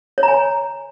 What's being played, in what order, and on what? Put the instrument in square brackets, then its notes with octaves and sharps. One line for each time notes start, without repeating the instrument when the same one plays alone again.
[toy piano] C#5
A#5
G#5